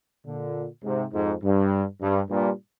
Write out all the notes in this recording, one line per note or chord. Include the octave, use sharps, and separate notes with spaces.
A#2 D3
G#2 C3
F2 G#2
G2
G2
G2 A#2